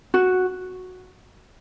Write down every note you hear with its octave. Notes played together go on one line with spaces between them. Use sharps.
F#4